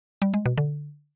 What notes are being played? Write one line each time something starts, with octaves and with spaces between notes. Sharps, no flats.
G3
G#3
B2
D3